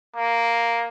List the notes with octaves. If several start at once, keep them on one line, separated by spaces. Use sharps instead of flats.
A#3